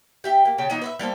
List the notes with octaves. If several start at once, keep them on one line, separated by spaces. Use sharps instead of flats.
G4 E5 G5
A#3
C#3 G5 A5
E3 B3 D#4 F4
B4 C5 E5
G3 A#3 A4 C5